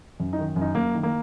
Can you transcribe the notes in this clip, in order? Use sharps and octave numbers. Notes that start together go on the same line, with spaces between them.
F#2
D#4
D#3
F#2
D#4
F#2 A#3
D#3
A#3